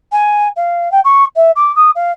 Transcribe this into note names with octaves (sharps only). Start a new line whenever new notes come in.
G#5
F5
G5
C#6
E5
D6
D#6
F5